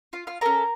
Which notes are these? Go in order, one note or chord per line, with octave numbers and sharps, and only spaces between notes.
F4 F5
F4 F5
C#4 A4 A#4 A#5